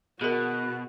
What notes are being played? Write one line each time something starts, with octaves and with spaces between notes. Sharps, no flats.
B2 F#4 G#4 A#4 F#6